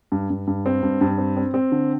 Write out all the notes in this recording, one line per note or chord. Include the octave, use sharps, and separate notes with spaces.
G2
G2
G2
C4
G2
G2
C4
C4
C4
D3